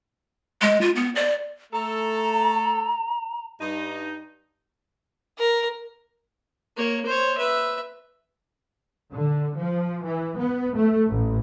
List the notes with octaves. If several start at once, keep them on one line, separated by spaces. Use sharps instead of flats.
G#3
F4
B3
D5
A3 A4 A#5
G2 D#4
A#4
A#3 C#5
C5 C#5
B4 E5
D3
F3
E3
B3
A3
A1